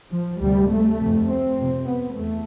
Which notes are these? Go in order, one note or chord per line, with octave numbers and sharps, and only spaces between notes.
F3
D2 C3 G3
A3
F2 C3
C4
F2 C3
B3
E2 A3